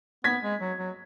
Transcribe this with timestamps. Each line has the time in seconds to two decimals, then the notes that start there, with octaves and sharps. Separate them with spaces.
0.24 B3 G#6 B6
0.43 G#3
0.60 F#3
0.78 F#3